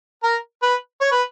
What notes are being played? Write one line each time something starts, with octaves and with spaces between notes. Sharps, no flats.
A#4
B4
C#5
B4